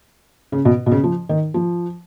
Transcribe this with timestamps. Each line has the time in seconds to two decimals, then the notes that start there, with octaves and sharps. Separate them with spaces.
0.52 C#3
0.65 B2
0.86 B2
0.91 C#3
1.04 F3
1.29 D#3
1.54 F3